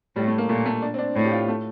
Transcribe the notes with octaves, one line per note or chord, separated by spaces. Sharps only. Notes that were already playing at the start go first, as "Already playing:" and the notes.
A2 G3
A3
A#3
A#2 A3
A3
D4
C4
D4
A2
G4
F4
A3